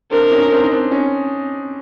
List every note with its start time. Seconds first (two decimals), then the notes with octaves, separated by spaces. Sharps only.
0.11 C4 D4 A#4
0.31 C#4 D#4
0.47 D#4
0.51 C4 D4
0.64 D#4
0.71 C4 D4
0.91 C#4 D#4